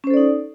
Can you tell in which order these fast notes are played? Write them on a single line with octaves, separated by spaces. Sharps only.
C#4 C5 A4 D5 D#4